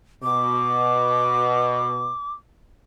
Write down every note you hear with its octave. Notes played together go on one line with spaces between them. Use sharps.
B2 D6